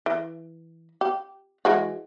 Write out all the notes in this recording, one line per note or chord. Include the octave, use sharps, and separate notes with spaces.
E3
G4
E3 G#3 F#4